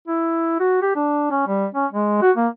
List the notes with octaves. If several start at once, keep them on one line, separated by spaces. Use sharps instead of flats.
E4
F#4
G4
D4
C#4
G3
C#4
G#3
F#4
A#3